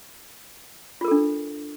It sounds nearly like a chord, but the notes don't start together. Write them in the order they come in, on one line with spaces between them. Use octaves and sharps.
F4 A#4 A4 D4